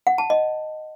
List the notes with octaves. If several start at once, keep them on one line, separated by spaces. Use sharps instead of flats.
F#5
A5
D#5